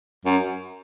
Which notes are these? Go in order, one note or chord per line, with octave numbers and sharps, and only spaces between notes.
F#2